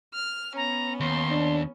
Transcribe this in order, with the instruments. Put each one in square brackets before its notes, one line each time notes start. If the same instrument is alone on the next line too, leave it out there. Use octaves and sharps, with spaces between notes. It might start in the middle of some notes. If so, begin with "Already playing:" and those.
[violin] F6
[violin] B3 C#4 [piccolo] A#5
[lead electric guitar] D#2 [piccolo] C6
[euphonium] D4